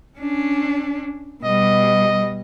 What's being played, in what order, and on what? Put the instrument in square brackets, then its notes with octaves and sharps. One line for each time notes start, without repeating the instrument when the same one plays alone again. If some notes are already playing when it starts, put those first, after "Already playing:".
[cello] C#4 D4
[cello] B2 G3 [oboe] D#5